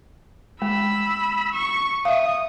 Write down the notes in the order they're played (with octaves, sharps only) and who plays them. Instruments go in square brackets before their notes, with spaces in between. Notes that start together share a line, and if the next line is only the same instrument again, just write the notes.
[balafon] G#3 [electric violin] B5 E6
[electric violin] C#6
[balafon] E5 F5 [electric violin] D#6